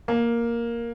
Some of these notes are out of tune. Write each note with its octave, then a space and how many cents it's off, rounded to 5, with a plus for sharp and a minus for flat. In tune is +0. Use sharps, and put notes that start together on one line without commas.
A#3 +5